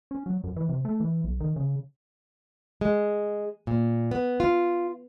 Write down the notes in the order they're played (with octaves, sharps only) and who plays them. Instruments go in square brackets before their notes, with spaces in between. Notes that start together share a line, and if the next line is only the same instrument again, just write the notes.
[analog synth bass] C#4
F#3
F#2
E3
C3
A3
E3
B1
D#3
C#3
[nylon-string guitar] G#3
A#2
B3
F4